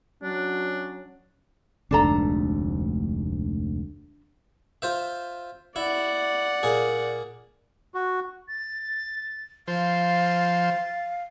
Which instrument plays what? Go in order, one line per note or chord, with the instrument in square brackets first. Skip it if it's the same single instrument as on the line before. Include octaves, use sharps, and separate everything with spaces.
[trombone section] F#3 C#4 [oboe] D4
[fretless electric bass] F1 D2 G#2 [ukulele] D4 A4 A#5
[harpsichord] F4 C5 E5
[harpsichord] E4 [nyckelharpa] D5 F#5
[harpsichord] A#2 G#4
[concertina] F#4
[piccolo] A6
[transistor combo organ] F3 C5 [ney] F5 [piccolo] A6